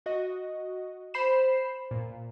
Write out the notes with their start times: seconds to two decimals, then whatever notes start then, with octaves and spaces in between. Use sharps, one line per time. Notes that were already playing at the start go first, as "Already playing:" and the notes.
0.06 F#4 D#5
1.14 C5 B5 C7 E7
1.91 A#2